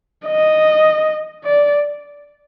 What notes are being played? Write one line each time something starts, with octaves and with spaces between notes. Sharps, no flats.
D#5
D5